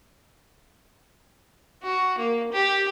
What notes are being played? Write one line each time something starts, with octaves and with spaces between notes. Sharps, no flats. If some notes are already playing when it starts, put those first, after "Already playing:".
F#4
A#3
G4